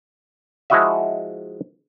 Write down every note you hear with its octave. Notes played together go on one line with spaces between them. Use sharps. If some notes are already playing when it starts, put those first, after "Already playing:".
F3 G#3 E4 F#4 D#5 E5